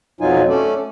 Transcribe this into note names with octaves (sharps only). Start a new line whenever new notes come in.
F2 B2 F#3 D#4 F4 G#5
A3 C#4 A4 D5